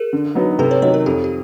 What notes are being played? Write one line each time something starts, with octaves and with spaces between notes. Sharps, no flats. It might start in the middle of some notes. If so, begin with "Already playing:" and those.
Already playing: G#4 A#4
D3
F#3 B3 D#4
C3 A4 B4
B4 C#5
D#3 F#3 C#5 D#5
A#4
F2 G4 A4
G4